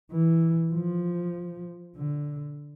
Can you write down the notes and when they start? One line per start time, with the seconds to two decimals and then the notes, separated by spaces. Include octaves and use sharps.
0.11 E3
0.73 F3
1.96 D3